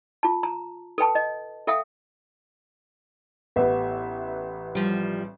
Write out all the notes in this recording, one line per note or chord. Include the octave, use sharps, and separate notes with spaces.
F4 A5
A#5
A4 B4 G5 A5
D#5
A4 E5 F5 G5 D#6
A1 B3 G4 A4 B4 E5 F#5
F3 G3